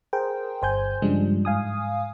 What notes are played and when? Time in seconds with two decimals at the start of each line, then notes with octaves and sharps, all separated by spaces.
0.13 G#4 A#4 C5 G5
0.62 G1 C5 G#5 G6
1.02 G2 C#3 F3 G3 G#3 D4
1.45 G#2 F5 G#5 D#6